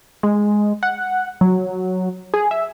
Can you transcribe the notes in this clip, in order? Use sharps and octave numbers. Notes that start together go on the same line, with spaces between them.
G#3
F#5
F#3
G#4
E5